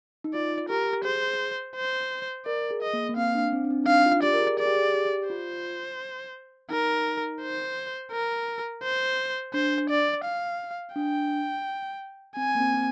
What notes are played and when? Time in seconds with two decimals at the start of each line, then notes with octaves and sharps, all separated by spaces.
0.24 D#4
0.34 F4 D5
0.69 G4 A#4
1.05 G#4 C5
1.76 C5
2.46 A#4 D5
2.71 G#4
2.82 D#5
2.93 A#3
3.09 A#3
3.17 C4 F5
3.35 D4
3.52 C4
3.65 D4
3.70 C4
3.84 D#4
3.88 D4 F5
4.06 F4
4.23 G4 D5
4.34 A#4
4.41 G#4
4.59 G#4 D5
4.66 G4
4.74 G#4
4.94 G4
5.29 F4 C5
6.71 D#4 A#4
7.42 C5
8.12 A#4
8.83 C5
9.54 D4 C5
9.90 D5
10.25 F5
10.96 D4 G5
12.37 C4 G#5
12.55 A#3
12.60 C4
12.74 C4